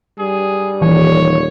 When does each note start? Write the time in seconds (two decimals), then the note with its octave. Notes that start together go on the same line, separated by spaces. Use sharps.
0.19 G3 G#4
0.82 D#1 E3 C#5